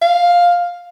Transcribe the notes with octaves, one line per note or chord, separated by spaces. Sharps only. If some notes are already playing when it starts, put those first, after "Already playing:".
F5